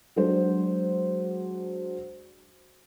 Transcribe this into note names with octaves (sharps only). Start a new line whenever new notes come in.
F#3 G#3 D4 F#4 C5